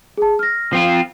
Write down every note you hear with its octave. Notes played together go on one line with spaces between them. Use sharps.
G#4 A5
F6 A#6
F3 C4 F4 C7